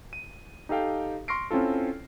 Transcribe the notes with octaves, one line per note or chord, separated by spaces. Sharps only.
D#7
D#4 G4 A4 F5 G5
C6 C#6 F6 A#6 C7 D7
C4 C#4 E4 F4 A4